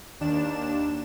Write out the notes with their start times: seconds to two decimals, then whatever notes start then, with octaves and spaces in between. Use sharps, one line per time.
0.20 D#2 D4 E7